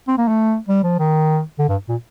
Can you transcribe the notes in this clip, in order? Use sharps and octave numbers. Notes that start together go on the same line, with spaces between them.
C4
A#3
A3
G3
F3
D#3
D3
G2
A#2